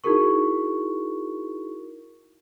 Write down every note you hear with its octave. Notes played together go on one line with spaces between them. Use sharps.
D#4 E4 F#4 G#4 A#4 C#6